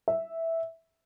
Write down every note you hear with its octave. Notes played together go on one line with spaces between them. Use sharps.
E5